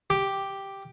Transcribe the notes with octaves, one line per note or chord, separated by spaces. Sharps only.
G4